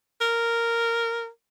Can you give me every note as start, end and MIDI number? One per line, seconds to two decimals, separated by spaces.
0.21 1.28 70